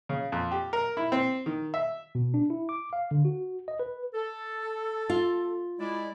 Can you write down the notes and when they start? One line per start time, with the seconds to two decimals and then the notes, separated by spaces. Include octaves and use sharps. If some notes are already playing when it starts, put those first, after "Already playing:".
0.09 C#3
0.32 F2
0.51 G4
0.73 A#4
0.97 E4
1.12 C4
1.46 D#3
1.74 E5
2.15 B2
2.34 D4
2.50 E4
2.69 D6
2.93 F5
3.11 D3
3.25 F#4
3.68 D#5
3.80 B4
4.14 A4
5.10 F4
5.79 G#3 E4 D5